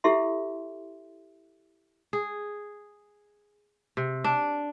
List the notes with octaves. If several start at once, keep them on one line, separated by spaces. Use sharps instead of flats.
E4 G4 A4 E5 C6
G#4
C3
D4